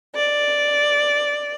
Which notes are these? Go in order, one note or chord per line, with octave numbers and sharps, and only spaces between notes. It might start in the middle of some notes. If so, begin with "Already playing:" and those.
D5